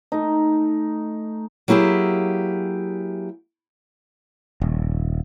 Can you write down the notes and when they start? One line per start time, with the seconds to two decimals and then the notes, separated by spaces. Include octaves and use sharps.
0.12 A3 D#4
1.68 F#3 A#3 E4 G4 G#4
4.62 D#1